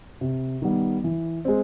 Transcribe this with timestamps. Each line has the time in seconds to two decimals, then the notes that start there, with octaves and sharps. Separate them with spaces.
0.21 C3
0.62 D#3 G3 B3
1.04 E3
1.45 G#3 C4